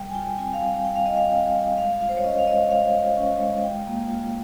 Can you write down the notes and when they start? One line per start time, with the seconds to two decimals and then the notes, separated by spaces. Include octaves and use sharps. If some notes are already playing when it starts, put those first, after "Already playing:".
Already playing: G3 G5
0.10 G#5
0.15 F4 G5
0.38 C4 G#5
0.53 F5
0.61 G3 G5
0.85 G3 G5
0.95 F5
1.06 F4 D#5
1.17 F5
1.31 C4
1.54 G3
1.78 G#3 F5
2.00 F4 F5
2.09 C5
2.17 C#5
2.24 C#4 D#5
2.39 F5
2.47 G#3 D#5
2.70 G#3 F5
2.94 F4
3.17 C#4
3.41 G#3
3.64 F4 G5
3.87 A#3
4.10 F4